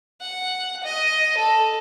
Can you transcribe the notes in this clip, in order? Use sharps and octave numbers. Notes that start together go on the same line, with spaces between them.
F#5
D#5
A4